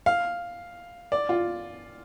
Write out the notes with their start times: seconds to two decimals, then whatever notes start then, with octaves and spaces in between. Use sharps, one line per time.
0.06 F5
1.12 D5
1.29 F4